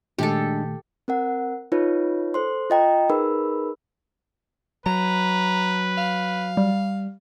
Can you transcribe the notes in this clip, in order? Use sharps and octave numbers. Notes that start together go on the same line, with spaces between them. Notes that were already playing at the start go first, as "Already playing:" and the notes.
A#2 D#3 G#3 A3 D4 G4 A4
C4 A#4 F#5
D#4 F4 B4 C#5
A4 C5 C6
F4 D#5 G5 A#5
D#4 G#4 A#4 B4 B5 E6
F#3 B4 A#5
F5
G3